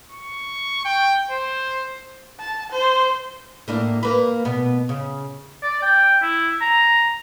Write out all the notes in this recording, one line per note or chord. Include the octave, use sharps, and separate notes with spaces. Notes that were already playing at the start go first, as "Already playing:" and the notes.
C#6
G5
C5
A5
C5
A2 A#3 D4
A#3 B4
B2 B3
C#3
D5
G5
E4
A#5